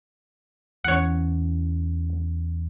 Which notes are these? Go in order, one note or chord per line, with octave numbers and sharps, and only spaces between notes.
E2 E3 C#4 C#5 F#5